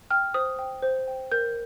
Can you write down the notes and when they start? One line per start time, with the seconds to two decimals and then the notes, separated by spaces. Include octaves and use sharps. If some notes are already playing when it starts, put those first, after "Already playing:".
0.10 G5 F6
0.34 C5 D#6
0.59 G5
0.83 C5
1.08 G5
1.32 A#4 G6